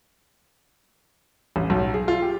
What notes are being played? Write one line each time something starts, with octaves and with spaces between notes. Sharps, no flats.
A1
B1
G#4
F4
G4